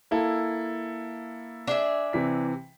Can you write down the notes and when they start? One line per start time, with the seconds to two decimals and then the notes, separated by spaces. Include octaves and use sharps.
0.11 A#3 E4 A4
1.67 D4 G#4 E5
2.13 C3 E3 B6